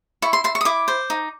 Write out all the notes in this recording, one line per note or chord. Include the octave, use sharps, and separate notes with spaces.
E4 C#6
C6
E4 C6
C#6
D#6
E4 D6
C5
D#4